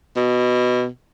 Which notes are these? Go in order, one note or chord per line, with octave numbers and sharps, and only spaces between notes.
B2